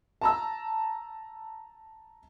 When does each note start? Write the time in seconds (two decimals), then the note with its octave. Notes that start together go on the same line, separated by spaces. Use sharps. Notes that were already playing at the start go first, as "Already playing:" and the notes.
0.21 A5 A#5 E6